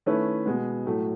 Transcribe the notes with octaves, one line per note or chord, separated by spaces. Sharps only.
D#3 A3 C#4 E4 B4
B2 G#3 B3
A2 F#3 A3